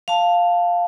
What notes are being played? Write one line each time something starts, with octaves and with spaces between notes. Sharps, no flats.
F5 A5